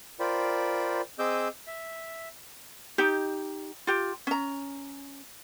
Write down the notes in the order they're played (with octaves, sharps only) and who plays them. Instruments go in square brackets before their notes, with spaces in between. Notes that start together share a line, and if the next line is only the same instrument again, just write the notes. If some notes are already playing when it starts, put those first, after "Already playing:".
[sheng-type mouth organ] F4 A#4 C5 D5 G5 B5
C4 G#4 D#5 D6 E6 G6
E5
[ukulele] D#4 G4
F4 G4
C#4 A#5